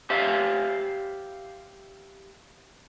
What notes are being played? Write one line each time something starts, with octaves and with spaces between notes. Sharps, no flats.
G4 C5 E5 F5